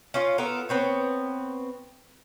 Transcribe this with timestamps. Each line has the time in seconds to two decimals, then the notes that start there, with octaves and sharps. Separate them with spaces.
0.14 C#4 F4
0.38 B3 F4 A4 A#4
0.69 B3 C4 C#5